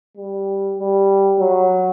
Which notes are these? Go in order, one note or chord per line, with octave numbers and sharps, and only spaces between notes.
G3
G3
F#3